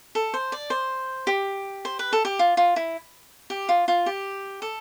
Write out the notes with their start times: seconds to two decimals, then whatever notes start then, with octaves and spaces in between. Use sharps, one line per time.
0.15 A4
0.34 C5
0.52 D5
0.70 C5
1.27 G4
1.85 C5
1.99 B4
2.13 A4
2.25 G4
2.39 F4
2.57 F4
2.76 E4
3.50 G4
3.69 F4
3.88 F4
4.06 G4
4.62 A4